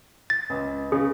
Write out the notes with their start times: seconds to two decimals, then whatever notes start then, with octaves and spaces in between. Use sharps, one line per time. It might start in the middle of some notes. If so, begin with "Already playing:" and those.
0.30 A6
0.50 C#2
0.92 C#3 G#4